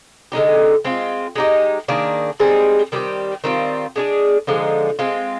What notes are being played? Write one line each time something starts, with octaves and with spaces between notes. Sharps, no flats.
D3 G#3 D#4 G4
G#3 C4 F4
G#3 D#4 G4
D#3 A#3 D4 G#4
G3 C4 D#4 G#4
D#3 G3 C4 G4
D#3 G3 C4 F4
G#3 D4 G#4
D3 F3 G#3 D#4
G#3 C4 F4